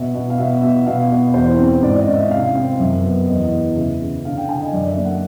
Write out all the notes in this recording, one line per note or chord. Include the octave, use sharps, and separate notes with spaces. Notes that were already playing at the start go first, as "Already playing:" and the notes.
Already playing: B2 E5
B2
F5
B2 E5
B2 E5
B2 F5
B2
E2 C5
C4
G#2 D5
D#5
C#4
E5
C3 F5
C4
F#2 E5
B3
E2 D#5
E2
C#3 E5
C#3
D3 F5
G5
D3 G#5
D#5
F#2 D5
E5
A#3
F#5